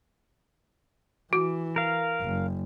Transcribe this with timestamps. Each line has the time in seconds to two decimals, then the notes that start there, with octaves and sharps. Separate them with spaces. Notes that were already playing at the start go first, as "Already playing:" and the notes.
1.33 E3 F#4
1.76 A#4 F5
2.22 F#1